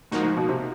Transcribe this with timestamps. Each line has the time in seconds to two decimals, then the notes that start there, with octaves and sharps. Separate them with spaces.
0.12 G#2 F3 A#3 D#4 F#4
0.23 G#2
0.37 B2
0.49 C3